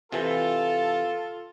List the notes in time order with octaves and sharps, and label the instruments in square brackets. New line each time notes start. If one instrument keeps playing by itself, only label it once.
[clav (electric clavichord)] C3 E3 [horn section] F4 [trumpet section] A4